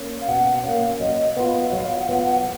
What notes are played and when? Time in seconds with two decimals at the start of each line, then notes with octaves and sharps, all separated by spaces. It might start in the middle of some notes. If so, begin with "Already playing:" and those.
Already playing: A#3 C#4
0.21 F5
0.28 B2 F#5
0.63 A#3 C#4 F5
1.00 F#3 D#5
1.36 B3 F4
1.67 D#5
1.72 F#3 F5
1.96 F#5
2.09 B3 F4
2.20 F#5